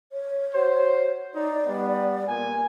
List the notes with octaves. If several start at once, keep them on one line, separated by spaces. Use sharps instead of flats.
C#5
F#4 C5
D#4 D5
G3 B3
A#2 G#5